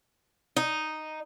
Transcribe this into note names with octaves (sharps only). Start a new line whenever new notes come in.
D#4